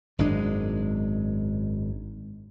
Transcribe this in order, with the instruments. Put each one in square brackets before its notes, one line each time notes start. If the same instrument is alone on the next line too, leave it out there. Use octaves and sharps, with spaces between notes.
[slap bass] G#1 F#2 G#3 D4